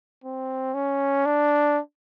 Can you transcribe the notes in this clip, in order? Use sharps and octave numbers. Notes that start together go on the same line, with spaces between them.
C4
C#4
D4